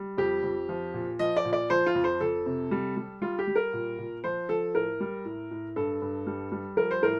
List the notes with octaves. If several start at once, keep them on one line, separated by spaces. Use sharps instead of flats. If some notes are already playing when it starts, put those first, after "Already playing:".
Already playing: G3
F2 G4
F2
F3
A#2
F3 D#5
D5
A#2
D5
F3 C5
F4
F2
C5
F2 A4
C3
G3
G3
G3 F4
G4
G3
A#4
A#2
A#2
F3 C5
F3 A4
A2 A#4
G3
A2
A2
G2 A4
G2
G3
G3
F3 A#4
C5
A2 A#4